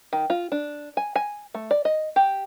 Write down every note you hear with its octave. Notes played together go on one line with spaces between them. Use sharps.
D#3
F4
D4
G#5
G#5
A3
D5
D#5
G4